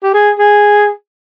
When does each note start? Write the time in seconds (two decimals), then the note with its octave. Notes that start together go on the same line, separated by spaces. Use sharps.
0.03 G4
0.14 G#4
0.39 G#4